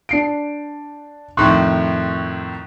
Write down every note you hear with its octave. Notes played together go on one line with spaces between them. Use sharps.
D4 C7 D7
F2 A2 D#3 C6 C#6 F#6